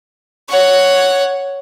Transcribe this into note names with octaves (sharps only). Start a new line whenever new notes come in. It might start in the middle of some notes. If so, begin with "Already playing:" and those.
C#5 F#5